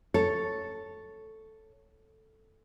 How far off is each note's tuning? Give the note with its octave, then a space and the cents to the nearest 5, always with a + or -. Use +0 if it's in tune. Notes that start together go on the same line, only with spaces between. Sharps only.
A4 +0 C#5 +0